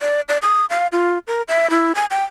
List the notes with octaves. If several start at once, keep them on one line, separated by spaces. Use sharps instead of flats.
D5
D5
D#6
F5
F4
A#4
E5
E4
G#5
G5